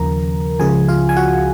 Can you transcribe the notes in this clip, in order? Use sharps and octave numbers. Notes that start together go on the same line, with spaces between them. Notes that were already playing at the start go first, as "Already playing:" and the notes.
Already playing: D#2 C#3 F3 A#4 A#5
C#2 C#3 F3 G#4 G#5
F4 F5
G#5
F#4 F#5